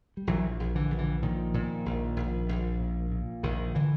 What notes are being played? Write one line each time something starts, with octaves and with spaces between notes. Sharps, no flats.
G3
A#1 E3 F#3
A#1
D3 E3
A#1
D3 E3
A#2 D#3 F3
A#2
A#1
A#1
A#1
A#2
A#2
A#1 D#3
D3 E3